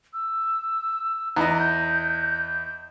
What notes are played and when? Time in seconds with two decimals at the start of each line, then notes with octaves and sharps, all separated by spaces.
0.13 E6
1.37 E2 D#5 A#5
1.59 G6